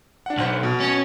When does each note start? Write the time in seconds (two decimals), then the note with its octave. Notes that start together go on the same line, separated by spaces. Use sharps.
0.26 D4 F#5
0.38 B1 C5 F#5 F6
0.63 B2
0.80 C#4